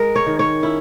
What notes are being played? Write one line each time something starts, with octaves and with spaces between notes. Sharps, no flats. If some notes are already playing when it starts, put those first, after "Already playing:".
Already playing: G#3 A#4
C#5
D#3
C#5
C#4 E4